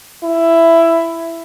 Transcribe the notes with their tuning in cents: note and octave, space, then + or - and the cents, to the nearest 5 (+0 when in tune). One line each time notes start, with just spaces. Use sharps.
E4 +10